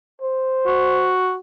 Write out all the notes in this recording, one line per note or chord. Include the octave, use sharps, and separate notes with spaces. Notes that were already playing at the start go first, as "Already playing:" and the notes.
C5
F#4